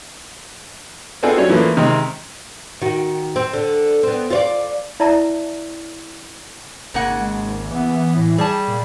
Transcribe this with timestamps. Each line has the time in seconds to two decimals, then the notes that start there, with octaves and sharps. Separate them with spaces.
1.23 B3 C4 D4 F4 G#4 A4
1.37 F#3 G3 C#4 D4 C#5
1.49 E3 F3 A3 A#3
1.77 C3 D#3 G#3 C4
2.82 D#3 F#4
3.36 C4
3.53 D3
4.03 B3 C4
4.30 F4 C#5 D5
5.00 E4 D5 E5 A5 A#5
6.94 G#1 C#3 A#3 F#5
7.19 G#3
7.71 E3 B3
8.16 A2
8.38 G3 G#4 A5
8.68 A#2